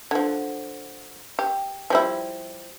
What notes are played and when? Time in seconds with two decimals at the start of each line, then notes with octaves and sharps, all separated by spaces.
0.11 D3 F3
1.39 G4
1.90 F3 G3 E4